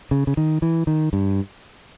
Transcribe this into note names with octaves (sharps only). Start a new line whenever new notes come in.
C#3
C#3
D#3
E3
D#3
G2